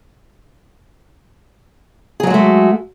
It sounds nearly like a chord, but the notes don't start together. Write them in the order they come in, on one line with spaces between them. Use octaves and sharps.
G#4 F#3 F#4 G#3 A3